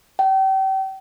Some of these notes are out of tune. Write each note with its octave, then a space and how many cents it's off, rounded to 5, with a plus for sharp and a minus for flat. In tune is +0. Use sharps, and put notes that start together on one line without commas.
G5 -35